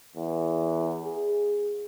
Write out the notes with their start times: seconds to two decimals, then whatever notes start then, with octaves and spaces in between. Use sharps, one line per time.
0.16 E2
1.04 G#4